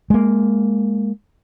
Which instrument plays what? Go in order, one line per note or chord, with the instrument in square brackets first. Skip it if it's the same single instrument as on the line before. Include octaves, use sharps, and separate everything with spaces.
[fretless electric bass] G#3 A#3